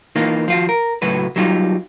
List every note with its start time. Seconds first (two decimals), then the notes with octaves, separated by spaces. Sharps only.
0.16 E3 A#3 D#4 F4
0.48 F3 F4 F#4
0.69 A#4
1.02 C#2 A2 F#3 F#4 B4
1.36 F#3 G3 D#4 F4